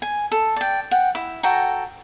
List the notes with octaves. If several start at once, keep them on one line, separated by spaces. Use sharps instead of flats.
G#5
A4
D5 G5
F#5 G5
E4
F#4 A4 G5 A#5